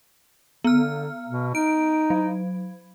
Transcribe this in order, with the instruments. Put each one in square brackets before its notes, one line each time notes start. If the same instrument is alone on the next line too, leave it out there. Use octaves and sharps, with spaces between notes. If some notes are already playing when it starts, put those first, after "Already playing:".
[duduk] D3 [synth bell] B3 F6
[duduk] B2
[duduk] D#4 [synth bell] D7
[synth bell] F#3